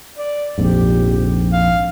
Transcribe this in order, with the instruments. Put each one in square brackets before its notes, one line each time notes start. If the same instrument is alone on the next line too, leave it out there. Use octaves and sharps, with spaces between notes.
[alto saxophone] D5
[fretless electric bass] A#1 F2 G#2 [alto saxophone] G4
[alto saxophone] F5